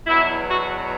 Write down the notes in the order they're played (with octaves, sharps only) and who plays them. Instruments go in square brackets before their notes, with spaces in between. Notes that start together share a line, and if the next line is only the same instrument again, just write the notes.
[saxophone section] E2 B2 F#3 E4
F#4